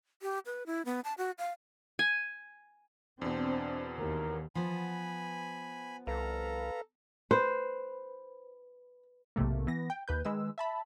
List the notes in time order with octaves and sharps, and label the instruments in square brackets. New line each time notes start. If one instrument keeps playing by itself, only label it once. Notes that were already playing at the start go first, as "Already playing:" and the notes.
[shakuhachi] G4
B4
E4
B3
A5
F#4
F5
[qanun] G#5
[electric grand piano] E2 B2 [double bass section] C4 [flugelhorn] D4
[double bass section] D#2 [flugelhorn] A#4
[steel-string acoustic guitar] F3 B3 [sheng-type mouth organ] G#5 B5
[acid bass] C2 [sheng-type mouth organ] A4 A#5 [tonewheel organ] B4 F5
[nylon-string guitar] B4 [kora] C5
[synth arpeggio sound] B1 G#2 C3 A3 A#3
E3 B3 A#6
G5
D#2 B4 G6
D#3 G#3 B4 E6
E5 A5 B5